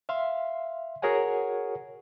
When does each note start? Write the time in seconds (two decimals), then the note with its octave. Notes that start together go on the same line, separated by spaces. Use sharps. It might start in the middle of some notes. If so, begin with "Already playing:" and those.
0.09 E5 F5 C6
1.02 F#4 G#4 A#4 C#5 F#5 G#5